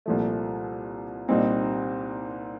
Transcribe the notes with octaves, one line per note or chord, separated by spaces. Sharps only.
C2 A#2 F3 A3
C2 A#2 G3 C4 D#4